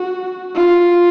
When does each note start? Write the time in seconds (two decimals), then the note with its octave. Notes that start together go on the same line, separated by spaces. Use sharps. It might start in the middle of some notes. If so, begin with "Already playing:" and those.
Already playing: F#4
0.55 F4